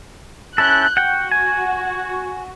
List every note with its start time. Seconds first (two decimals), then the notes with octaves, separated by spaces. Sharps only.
0.58 C#4 E4 A4 F#6 G6
0.97 F#4 F#5 G5
1.31 G#5